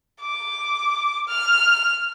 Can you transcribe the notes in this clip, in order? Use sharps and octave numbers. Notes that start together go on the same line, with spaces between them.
D6
F6